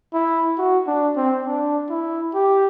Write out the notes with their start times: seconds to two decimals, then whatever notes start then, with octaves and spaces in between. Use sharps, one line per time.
0.14 E4
0.58 F#4
0.87 D4
1.17 C4
1.46 D4
1.90 E4
2.34 G4